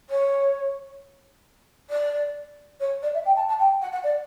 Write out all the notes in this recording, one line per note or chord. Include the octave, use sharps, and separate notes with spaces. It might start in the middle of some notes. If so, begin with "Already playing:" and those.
C#5
D5
C#5
D5
E5
G5
A5
A5
G5
F#5
F#5
D5